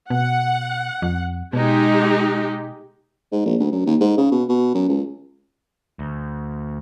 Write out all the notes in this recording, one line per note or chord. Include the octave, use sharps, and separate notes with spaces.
B2 F#5
F2
B2 G#3 D#4 G4
G#2
A#1
D2
F#2
D#2
G#2
C#3
B2
B2
F#2
C#2
D2